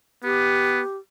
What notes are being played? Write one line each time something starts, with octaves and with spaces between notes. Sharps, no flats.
B3 G4